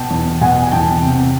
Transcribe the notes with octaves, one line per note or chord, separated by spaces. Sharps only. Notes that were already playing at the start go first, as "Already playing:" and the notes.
Already playing: B2 G5 A5
E2
B2 F#5 G#5
E2 G5 A5
C3